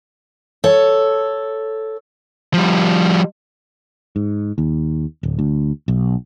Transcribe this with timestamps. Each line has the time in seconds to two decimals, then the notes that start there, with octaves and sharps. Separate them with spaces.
0.64 A4 C#5
2.54 F3 G3
4.16 G#2
4.58 D#2
5.23 D1
5.39 D2
5.88 B1